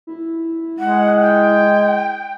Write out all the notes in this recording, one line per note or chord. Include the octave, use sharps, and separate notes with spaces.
E4
G#3 F#5
G5